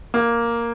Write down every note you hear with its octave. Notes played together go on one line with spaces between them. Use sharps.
A#3